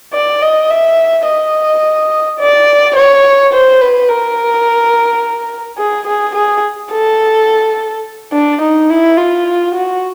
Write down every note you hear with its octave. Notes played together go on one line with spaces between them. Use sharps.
D5
D#5
E5
D#5
D5
C#5
C5
B4
A#4
G#4
G#4
G#4
A4
D4
D#4
E4
F4
F#4